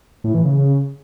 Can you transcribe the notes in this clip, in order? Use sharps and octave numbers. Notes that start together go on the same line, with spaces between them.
A2
E3
C#3